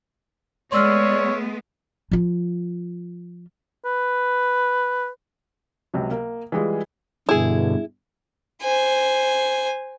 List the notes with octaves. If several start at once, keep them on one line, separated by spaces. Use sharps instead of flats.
G#3 A3 B3 C#5 D5 C6 E6 F6
F3 F4
B4
C#2 C3 F#3
A#3
E3 G3 G#3 F4 G#4
G2 B2 D3 E4 G#4
C5 G#5